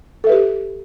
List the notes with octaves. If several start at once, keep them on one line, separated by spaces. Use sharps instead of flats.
G4 A4 B4 E5